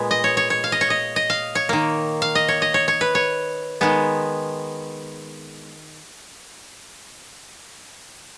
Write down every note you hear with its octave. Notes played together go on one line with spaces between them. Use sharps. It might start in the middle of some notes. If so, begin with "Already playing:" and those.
Already playing: A#2 G#3 B3
D#5
C#5
C#5
C#5
F5
D#5
C#5
D#5
D#5
F5
C#5
D#3 A#3
F5
D#5
C#5
D#5
C#5
C#5
B4
C#5
D#3 G#3 B3